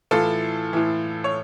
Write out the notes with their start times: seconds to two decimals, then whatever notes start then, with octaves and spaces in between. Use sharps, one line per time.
0.11 A2 E3 F4 A4
0.73 A2 E3
1.24 C#5